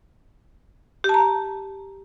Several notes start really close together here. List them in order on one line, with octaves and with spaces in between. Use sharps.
G4 A5 A#5